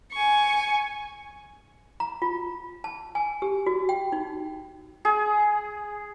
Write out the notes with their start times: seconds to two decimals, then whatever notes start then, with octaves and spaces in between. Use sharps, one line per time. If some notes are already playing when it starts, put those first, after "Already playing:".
0.13 G#5 C#6
2.00 A#5
2.22 F4
2.84 A5
3.15 G#5
3.42 G4
3.66 F#4
3.89 G5
4.12 D#4
5.05 G#4